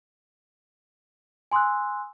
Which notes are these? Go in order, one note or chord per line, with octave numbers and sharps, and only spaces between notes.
G#5 C6 D#6 E6 F#6